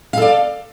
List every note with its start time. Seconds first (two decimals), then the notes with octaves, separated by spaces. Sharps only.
0.13 F5
0.18 A4
0.22 D5